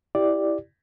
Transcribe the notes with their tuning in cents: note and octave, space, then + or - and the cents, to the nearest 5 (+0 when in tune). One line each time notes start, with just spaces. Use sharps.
E4 -5 G4 +0 D5 +0